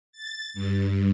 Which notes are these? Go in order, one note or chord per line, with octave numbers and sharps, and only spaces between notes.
A6
G2